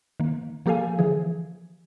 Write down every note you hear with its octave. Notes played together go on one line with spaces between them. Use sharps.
D#3 A#3
F3 A#3 G4 A4 F5 G#5
D3 E3 F3 G#4